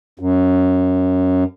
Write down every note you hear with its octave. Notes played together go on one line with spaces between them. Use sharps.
F#2